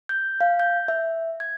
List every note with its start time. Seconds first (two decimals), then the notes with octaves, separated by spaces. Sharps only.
0.09 G6
0.41 F5
0.60 G6
0.88 E5
1.40 G#6